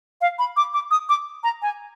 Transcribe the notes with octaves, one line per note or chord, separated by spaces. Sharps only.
F5
B5
D6
D6
D#6
D6
A#5
G#5